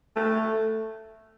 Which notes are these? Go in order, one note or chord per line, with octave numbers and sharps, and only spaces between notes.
A3